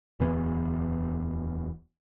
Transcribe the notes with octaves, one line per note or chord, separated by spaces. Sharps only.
D1 E2 E3 B3